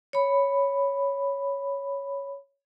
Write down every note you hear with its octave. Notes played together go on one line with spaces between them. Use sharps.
C#5 B5